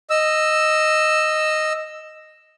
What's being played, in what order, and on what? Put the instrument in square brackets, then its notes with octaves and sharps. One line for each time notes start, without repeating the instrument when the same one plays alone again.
[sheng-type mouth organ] D#5 E6